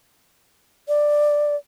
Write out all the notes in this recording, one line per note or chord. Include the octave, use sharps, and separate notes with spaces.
D5